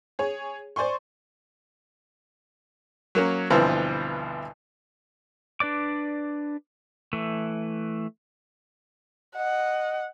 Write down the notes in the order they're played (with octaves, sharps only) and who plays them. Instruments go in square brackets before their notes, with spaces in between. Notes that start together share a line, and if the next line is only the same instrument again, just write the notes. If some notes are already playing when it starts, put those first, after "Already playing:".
[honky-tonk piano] G#4 C#5
C5 D5 G#5 C6 C#6
[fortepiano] F#3 A#3 C#4
D2 G2 B2 E3 F3 C4
[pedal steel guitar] D4 B4 D5 D6
E3 A3
[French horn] D#5 [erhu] F#5